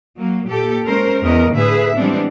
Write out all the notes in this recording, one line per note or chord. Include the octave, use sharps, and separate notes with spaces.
F#3 A#3
A#2 G4 A4
G#3 C#4 A#4 C5
E2 B3 A#4 D#5
A2 D3 G#4 B4 E5
E3 G3 G#3 B3 C4 D4